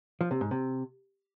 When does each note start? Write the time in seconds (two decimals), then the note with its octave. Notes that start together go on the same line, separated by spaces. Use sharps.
0.21 F3
0.31 C3
0.41 G#2
0.51 C3